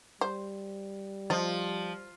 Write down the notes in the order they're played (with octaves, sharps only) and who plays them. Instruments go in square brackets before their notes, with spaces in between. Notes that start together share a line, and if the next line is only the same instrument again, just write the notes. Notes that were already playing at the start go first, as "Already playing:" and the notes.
[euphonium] G3 [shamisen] C5
[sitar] F3 [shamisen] F4 D#5